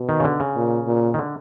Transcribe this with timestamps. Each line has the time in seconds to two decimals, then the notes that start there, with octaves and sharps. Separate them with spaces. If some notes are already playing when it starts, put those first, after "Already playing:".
Already playing: B2
0.09 D#3
0.20 C#3
0.24 D3
0.40 C#3
0.56 A#2
0.87 A#2
1.14 D#3
1.19 D3